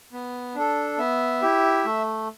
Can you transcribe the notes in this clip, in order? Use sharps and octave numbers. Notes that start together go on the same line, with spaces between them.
B3
D4 A4
B3 E5
E4 G4
A3